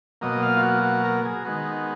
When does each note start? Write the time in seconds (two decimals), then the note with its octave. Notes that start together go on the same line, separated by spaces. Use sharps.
0.21 B2 F#3 A#3 D#5
0.43 F5
0.57 F4
0.63 F#4
0.84 F#4
1.04 A#4
1.25 G#4
1.45 D#3 G#3 B3 F#4